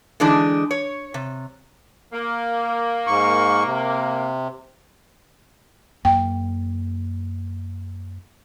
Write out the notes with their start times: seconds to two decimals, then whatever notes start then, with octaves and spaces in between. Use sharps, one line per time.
0.20 D3 E3 G#3 D4 D#4
0.71 C#5
1.14 C3
2.13 A#3
3.07 G#2 C#6
3.65 C3
6.05 F#2 A#3 G5